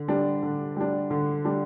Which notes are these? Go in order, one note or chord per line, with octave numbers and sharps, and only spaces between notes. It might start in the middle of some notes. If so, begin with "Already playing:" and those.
Already playing: D3
G3 D4
D3
G3 D4
D3
G3 D4